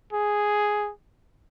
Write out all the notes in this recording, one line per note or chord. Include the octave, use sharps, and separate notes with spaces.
G#4